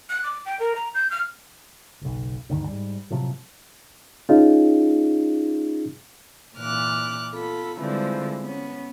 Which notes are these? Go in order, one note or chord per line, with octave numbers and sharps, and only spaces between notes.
F#6
D6
G5
A#4
A#5
G6
F6
F#1 B1
D2 G2 D3 D#3
G#2 G3
A2 C3 F3 F#3
C#4 D#4 F4 G#4
A#2 E3 D6 F6 F#6
B3 F4 A4 B5
D3 E3 F3 G3 G#3 C4
B3 C#4